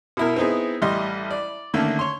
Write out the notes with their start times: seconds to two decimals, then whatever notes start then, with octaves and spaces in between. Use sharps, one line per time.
0.17 B2 E4 A#4
0.36 B3 C4 D#4 E4 G#4
0.82 A1 G3 D#5 C6
1.31 D5
1.74 D3 D#3 A3 A#3 C#4
1.99 C#5 C6